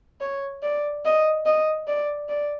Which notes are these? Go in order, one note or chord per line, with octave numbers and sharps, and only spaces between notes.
C#5
D5
D#5
D#5
D5
D5